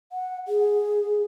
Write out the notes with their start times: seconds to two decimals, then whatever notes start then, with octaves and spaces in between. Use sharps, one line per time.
0.12 F#5
0.48 G#4